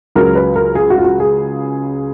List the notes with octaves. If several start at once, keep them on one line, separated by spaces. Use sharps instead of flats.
C#2 C#3 F#3 A#4
B4
A#4
G#4
F#4
F4
F#4
G#4